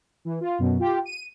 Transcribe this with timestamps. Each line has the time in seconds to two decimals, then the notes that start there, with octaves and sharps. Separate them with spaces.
0.25 E3
0.41 F4
0.59 F#2 B2
0.79 F4 G4
1.05 D#7